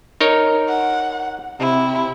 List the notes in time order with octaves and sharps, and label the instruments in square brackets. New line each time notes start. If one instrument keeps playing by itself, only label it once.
[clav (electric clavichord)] D#4 A#4 C#5
[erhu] F#5
[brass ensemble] C3 [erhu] E4